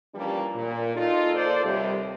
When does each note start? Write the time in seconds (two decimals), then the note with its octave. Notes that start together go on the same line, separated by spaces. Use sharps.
0.15 E3 F3 G3 A#3 C#4 D4
0.55 A#2
0.95 D#4 F4 A4
1.34 F3 A#3 A4 C5 D5
1.64 D#2 C3 G3